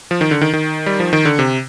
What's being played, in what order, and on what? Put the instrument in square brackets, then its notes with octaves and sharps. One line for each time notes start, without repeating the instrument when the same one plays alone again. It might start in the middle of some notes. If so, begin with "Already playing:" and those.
[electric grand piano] F3
D#3
D3
D#3
D#3
G3
F3
D#3
D3
C3